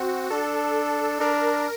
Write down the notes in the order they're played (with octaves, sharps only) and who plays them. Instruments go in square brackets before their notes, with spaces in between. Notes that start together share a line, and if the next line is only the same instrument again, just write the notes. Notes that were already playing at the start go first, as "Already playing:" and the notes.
Already playing: [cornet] C4 [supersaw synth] F#4
[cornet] D4 [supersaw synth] A4
[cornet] D4 [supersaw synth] A#4